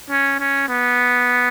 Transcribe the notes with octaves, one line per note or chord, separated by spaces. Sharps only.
C#4
C#4
B3